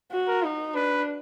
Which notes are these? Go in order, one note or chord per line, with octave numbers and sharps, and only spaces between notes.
F#4
A#4
D#4
D4 B4